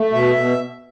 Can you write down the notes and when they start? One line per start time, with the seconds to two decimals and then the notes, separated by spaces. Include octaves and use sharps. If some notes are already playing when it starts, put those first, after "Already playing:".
Already playing: A3
0.12 B2 E5
0.36 B2